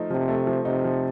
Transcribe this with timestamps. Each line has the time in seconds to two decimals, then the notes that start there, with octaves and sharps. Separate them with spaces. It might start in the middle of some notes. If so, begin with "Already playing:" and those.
Already playing: F3 A3 D#4
0.11 C3 F3
0.28 A3
0.47 F3
0.65 C3 D#4
0.84 F3